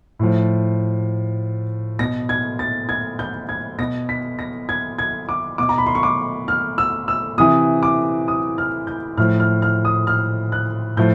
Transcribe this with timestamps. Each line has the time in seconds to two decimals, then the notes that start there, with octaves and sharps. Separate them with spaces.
0.19 A2 F3
1.99 B2 A#6
2.29 G#6
2.59 A6
2.89 G#6
3.19 G6
3.49 G#6
3.78 B2 A#6
4.09 B6
4.39 A#6
4.69 G#6
4.98 G#6
5.29 D6
5.58 B2 D6
5.69 A#5
5.78 B5
5.86 C6
5.95 C#6
6.03 D6
6.48 F6
6.78 E6
7.08 E6
7.38 C3 E3 D#6
7.83 D6
8.28 D#6
8.58 F6
8.87 G6
9.17 A2 F3 F6
9.40 F6
9.62 F6
9.85 D#6
10.07 F6
10.52 F#6
10.97 A2 F3 G6